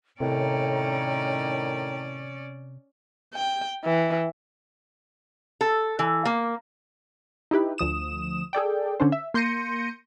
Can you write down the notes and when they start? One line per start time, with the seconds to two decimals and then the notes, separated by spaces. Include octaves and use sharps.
0.20 A2 C3 D#3 C#4 C#5 D5 G5 A#5
3.34 G5
3.85 E3
5.61 A4
5.99 E3
6.25 A#3
7.51 D#4 E4 G4 B4
7.78 D2 F3 D#6 E7
8.53 G#4 A4 D5 G5
9.00 D3 C#4 D4 C5
9.12 E5
9.34 A#3 C6 G6 A#6 C#7 D#7